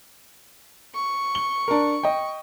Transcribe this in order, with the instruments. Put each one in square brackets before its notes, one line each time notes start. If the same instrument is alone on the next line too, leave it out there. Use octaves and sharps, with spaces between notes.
[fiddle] C#6
[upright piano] G7
D4 A#4
D#5 G5